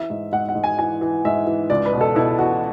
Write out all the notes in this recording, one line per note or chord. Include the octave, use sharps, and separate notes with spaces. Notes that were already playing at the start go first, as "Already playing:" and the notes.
Already playing: E3 E5
G#2
G#2 F#5
F#5
G#2
G#5
E3 G#5
E3
G#2 E5
E3
C#2 D5
B4
B2
A4
B2 E4
B2 F#4